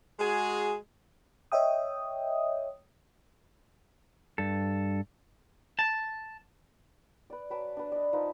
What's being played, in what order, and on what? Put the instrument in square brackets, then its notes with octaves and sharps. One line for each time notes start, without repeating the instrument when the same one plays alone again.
[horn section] G#3 F#4 G#4
[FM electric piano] C#5 D#5 E5 G5 D#6
[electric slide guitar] G2 A4
[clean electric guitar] A5
[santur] B4 D5
F#3 B4 A5 D6
D4 B4
D5 D#5
F3 D#4 F4 B4